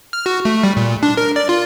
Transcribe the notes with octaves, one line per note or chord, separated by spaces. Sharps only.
F6
F#4
A3
G3
A#2
D4
A#4
D5
F4